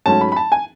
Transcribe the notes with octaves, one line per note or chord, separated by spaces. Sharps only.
G#2 F#3 A3 C#4 A5
B5
B5
A5
G#5